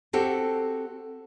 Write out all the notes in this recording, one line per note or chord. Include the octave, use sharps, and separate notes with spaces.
C4 F#4 G4 A4